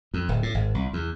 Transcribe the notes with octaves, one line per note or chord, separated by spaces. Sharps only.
F2
D1
A2
G#1
C2
E2